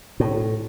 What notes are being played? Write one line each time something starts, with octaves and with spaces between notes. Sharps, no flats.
A2